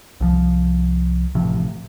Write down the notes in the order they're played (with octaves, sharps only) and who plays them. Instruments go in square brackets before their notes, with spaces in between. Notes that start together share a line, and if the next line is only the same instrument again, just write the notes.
[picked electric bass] C2 F3
A1 A2 C3 F3